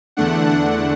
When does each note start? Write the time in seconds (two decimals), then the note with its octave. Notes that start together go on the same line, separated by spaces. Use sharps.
0.17 E2 D3 A3 D4 F#5
0.48 F#5